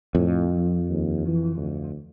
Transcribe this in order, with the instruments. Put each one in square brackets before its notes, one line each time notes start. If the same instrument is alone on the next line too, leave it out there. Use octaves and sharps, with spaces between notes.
[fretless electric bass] F2 [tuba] A2
[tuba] F3
D#2
E3
D2